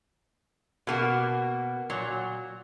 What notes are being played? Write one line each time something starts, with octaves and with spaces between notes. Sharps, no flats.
B2 A#3 F#4
A#2 F#3